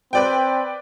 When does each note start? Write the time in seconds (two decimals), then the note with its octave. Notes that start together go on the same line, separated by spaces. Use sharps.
0.13 C4 B4 D5 G5